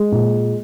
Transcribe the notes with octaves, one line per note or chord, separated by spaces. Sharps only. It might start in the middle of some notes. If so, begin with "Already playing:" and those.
Already playing: G#3
A#2